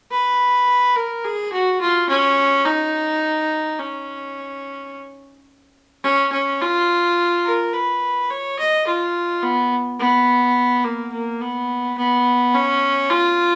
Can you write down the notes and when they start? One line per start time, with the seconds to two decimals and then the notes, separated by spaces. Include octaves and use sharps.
0.11 B4
0.96 A#4
1.24 G#4
1.52 F#4
1.81 F4
2.09 C#4
2.65 D#4
3.79 C#4
6.03 C#4
6.32 C#4
6.61 F4
7.45 A#4
7.73 B4
8.30 C#5
8.59 D#5
8.87 F4
9.43 B3
9.99 B3
10.84 A#3
11.12 A#3
11.41 B3
11.97 B3
12.54 C#4
13.10 F4